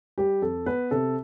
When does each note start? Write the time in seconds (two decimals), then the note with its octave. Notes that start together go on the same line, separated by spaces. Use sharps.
0.18 G3 G4
0.42 F2 A4
0.66 B3 B4
0.91 C3 A4